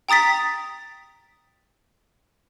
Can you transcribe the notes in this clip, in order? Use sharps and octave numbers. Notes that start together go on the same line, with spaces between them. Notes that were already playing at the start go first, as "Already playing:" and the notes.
G5 A#5 D#6 A6 B6